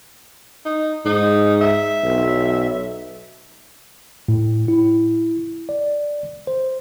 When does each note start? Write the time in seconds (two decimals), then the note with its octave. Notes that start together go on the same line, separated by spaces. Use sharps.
0.65 D#4
1.05 G#2 D#4
1.61 E5
2.04 B1
4.28 A2
4.68 E4
5.69 D5
6.47 C5